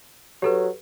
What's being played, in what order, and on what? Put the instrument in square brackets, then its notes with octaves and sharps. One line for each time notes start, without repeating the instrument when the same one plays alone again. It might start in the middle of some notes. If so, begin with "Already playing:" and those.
[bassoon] F#3 [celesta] G4 A4 B4